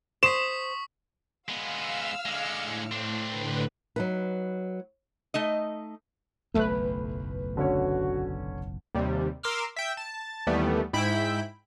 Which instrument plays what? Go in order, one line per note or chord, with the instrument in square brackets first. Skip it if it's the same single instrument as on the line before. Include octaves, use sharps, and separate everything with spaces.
[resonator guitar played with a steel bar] C5 [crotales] C#6 D#6 B6 [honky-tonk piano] E7
[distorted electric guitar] G#3 B3 [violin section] F5 E6 F6
[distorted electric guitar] D3 G#3 [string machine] D6 C#7
[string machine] A2
[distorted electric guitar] C4 D4
[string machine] A2 D3 B4
[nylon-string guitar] F#3 D#4 B4
[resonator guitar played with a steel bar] A3 D#4 D#5
[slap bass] F#1 B1 E2 [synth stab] A3 B4
[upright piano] D3 C#4 C#5 [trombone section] F#4
[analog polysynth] D#2 C3 G3
A#4 C6 D6 E6 F6
E5 G5
A5
D#2 E3 G3 A3 B3
G#2 E4 G5 B5 B6 D7